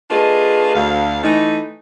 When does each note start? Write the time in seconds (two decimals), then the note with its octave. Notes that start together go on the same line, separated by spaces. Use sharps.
0.11 A3 D4 F4 G#4 B4 D#5
0.75 D2 F5
1.23 E3 A3 D#4